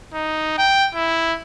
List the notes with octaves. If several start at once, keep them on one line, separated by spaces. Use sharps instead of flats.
D#4
G5
E4